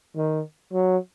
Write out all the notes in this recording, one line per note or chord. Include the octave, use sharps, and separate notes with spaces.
D#3
F#3